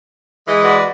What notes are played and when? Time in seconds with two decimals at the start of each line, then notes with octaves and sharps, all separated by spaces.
0.47 E3 G#3
0.64 F#4 B4 D5